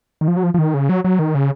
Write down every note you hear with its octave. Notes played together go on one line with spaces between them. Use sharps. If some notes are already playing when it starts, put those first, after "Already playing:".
D#3
F3
F#3
F3
F3
D#3
C#3
F#3
F#3
D#3
C#3